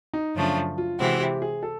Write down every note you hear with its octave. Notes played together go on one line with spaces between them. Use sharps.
D#4
F#2 C#3 F3 A3 D4
F4
C3 E3 G#3 C4 E4 F#4
G4
G#4
A4